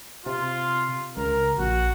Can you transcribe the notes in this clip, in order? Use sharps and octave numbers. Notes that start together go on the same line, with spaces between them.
C3 F4
C#2 A#4
A#1 F#4